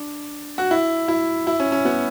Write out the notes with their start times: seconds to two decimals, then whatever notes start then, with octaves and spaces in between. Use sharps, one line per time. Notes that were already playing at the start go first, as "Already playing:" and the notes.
Already playing: D4
0.58 F#4
0.71 E4
1.08 E4
1.47 E4
1.60 C#4
1.72 C#4
1.85 B3